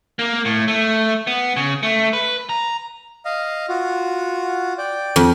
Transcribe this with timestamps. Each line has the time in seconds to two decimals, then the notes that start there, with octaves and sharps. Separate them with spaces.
0.19 A#3
0.45 A2
0.68 A3
1.27 B3
1.56 C#3
1.83 A3
2.13 B4
2.49 A#5
3.25 D#5 F5
3.68 F4 F#4
4.78 D5 G5
5.16 F2